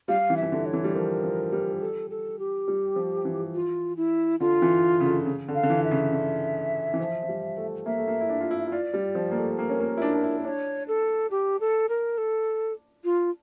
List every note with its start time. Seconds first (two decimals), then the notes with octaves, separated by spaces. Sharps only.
0.08 G3 F5
0.30 E3
0.37 E5
0.42 E3
0.52 D3
0.66 C#5
0.73 E3
0.84 G3
0.94 F3 A#4
1.23 F3
1.52 G3
1.81 A4
2.10 A4
2.39 G4
2.68 G3
2.96 F3
3.25 E3
3.54 F4
3.97 E4
4.40 D3 F4
4.62 E3
5.00 C#3
5.05 D3
5.26 C#3
5.48 D3
5.55 F5
5.63 D3
5.70 E3
5.84 E5
5.91 C#3
6.13 D3
6.94 E3
7.00 F3
7.22 F3
7.28 G3
7.57 A3
7.86 A#3 E5
7.97 A3
8.08 A#3
8.21 E4
8.29 D4
8.40 F4
8.51 E4
8.68 E4
8.72 F4 D5
8.94 G3
9.15 F3
9.31 A#3
9.37 A3
9.59 A#3 A#4
9.69 C#4
9.80 A#3
9.97 E4
10.02 D4
10.13 D4
10.24 E4
10.45 D4 C#5
10.88 A4
11.31 G4
11.60 A4
11.89 A#4
12.18 A4
13.04 F4